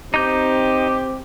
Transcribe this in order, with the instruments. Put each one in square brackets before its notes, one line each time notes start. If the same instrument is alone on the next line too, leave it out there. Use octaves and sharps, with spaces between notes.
[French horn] C4 [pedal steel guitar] D#4 G6 [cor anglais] G4